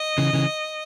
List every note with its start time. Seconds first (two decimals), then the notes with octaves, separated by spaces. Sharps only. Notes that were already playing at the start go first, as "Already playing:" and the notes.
Already playing: D#5
0.18 C#3 E3
0.33 C#3 E3